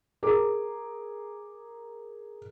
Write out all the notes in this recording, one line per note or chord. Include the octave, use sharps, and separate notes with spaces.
G#4 A#4 D6